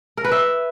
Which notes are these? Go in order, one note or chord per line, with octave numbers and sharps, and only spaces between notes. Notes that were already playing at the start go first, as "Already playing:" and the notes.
A#4
B4
E5